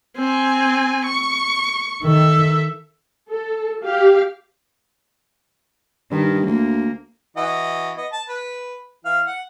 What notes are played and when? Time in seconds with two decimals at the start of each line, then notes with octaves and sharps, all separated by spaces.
0.17 C4 G#5
1.06 C#6
2.04 D#3 A4 E5
3.30 A4
3.84 G4 F5
6.11 G2 D#3
6.47 D2 A#3
7.37 E3 F#4 D#5
7.97 B3 D#5
8.12 A5
8.29 B4
9.05 E3 F5
9.27 F#5